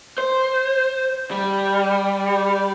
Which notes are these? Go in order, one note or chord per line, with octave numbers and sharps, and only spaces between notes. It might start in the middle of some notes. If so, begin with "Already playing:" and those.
C5
G3